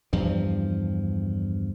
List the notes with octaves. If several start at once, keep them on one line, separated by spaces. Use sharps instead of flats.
E2 G2 F3